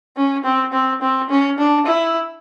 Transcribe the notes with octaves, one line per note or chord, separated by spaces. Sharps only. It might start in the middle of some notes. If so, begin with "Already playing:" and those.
C#4
C4
C4
C4
C#4
D4
E4